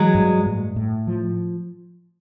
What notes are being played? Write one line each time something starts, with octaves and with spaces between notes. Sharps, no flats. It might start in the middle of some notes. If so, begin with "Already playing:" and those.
Already playing: E3 F#3 G#3
G2
A2
A2
F3